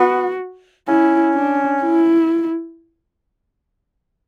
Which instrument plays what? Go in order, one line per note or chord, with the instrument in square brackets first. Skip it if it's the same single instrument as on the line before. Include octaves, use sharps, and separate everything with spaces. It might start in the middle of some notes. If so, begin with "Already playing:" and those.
Already playing: [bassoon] B3 [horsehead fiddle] F#4
[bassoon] C#4 [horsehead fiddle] E4
[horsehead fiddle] D4
E4